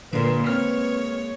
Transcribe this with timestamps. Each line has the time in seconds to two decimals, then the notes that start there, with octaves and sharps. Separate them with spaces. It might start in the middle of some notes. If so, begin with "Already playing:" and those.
0.13 A#2 D3 G#3 A#3 B4
0.47 C4 C#5 F6